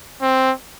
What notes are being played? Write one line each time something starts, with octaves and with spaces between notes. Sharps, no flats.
C4